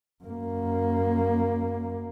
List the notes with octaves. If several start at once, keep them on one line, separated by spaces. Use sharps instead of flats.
F#2 A#3